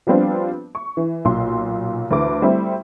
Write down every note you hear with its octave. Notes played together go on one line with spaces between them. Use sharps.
F3 G3 B3 C4 D4 F4
C#6
E3
B1 A#2 C6
D2 E3 B4 D6
G3 A3 C4 E4